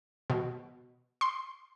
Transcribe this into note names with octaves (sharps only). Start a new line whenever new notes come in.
B2
C6